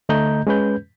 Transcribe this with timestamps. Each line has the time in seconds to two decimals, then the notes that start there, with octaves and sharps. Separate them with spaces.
0.09 D3 A3 D#5 A#5 G6
0.47 G#3 C#4 B4 G6